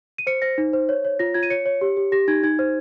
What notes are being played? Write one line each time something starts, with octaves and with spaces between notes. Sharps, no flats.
D#7
C5 C#7
C5 A#6
D#4
C5
C#5
C#5
F4 A#6
F4 G#6
D#7
C#5 C#7
C#5
G4
G4
G4 A#6
D#4 G#6
D#4 G#6
C5